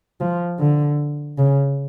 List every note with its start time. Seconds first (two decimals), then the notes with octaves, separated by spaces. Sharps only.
0.20 F3
0.59 D3
1.38 C#3